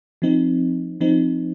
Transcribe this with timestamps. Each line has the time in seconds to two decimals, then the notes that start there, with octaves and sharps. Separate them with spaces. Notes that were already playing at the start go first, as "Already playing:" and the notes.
0.22 F3 C4 D#4
1.01 F3 C4 D#4